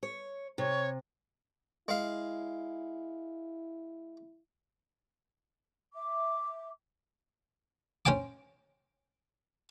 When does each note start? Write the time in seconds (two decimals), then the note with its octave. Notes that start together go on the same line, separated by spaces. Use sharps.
0.03 C#5
0.58 C3 C#5
1.88 G#3 E4 F5
5.94 E5 D6
8.05 C#4 C5 G5 G#5 D6